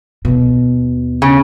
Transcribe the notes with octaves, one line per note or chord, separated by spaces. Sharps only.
D#2 B2
C#3